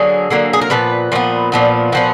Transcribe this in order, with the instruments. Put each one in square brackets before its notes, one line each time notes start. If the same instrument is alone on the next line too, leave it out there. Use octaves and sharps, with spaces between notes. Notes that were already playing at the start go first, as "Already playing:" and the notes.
Already playing: [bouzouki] D3 F#3 A#3 G#4
D3 F#3 A#3
G#4
A#4
A#2 F3 B3 B4
A#2 F3 B3
A#2 F3 B3
A#2 F3 B3 F#4